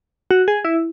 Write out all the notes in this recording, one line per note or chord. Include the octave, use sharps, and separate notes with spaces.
F#4
G#4
E4